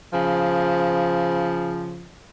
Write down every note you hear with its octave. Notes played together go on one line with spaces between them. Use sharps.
C#3 F3